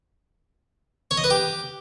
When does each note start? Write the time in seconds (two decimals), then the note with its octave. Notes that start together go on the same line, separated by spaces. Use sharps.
1.11 C#5
1.17 D#5
1.24 B4
1.30 G4